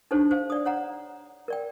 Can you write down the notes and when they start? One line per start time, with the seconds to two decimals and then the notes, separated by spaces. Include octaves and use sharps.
0.11 D4 D#4 G4 A4 C5 C#5
0.31 C5 F5
0.50 D5 D#6
0.65 C#5 F#5 A#5
1.48 A#4 D5 G5